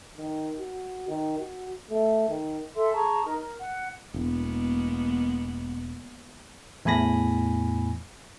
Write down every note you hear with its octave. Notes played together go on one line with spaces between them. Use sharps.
D#3
F#4
D#3
F#4
A3
D#3
A4 E5 C6
G#4 A5 A#5 C#6
D#4 A#4
A#4
F#5
E1 G#3 A#3 B3
E2 A2 G#5 B5 A#6